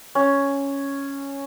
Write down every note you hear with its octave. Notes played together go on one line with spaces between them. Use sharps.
C#4